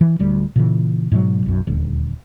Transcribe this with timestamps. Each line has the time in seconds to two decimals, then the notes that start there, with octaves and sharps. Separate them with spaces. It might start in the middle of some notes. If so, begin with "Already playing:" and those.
0.01 E3
0.19 D1 D2 G3
0.56 A#2 C#3 E3
1.12 G#2 B2 D3 F#3
1.46 B1 F#2
1.67 D#1 D2